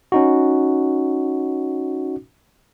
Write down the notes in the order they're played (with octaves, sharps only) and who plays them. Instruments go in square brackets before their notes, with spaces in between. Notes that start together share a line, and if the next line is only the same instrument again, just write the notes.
[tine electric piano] C#4 D#4 F#4